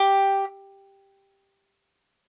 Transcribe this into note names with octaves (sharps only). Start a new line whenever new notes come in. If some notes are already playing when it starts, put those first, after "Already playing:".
Already playing: G4